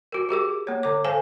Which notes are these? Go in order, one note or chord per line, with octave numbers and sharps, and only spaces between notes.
F#4 A#4
G4 G#4 A#4 D6
A#3 C#5
D3 C#5 D6
A4 C5 F5 G#5 A5